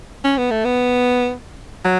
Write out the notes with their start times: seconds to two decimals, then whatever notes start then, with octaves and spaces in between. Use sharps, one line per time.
0.24 C#4
0.37 B3
0.51 A3
0.65 B3
1.85 F#3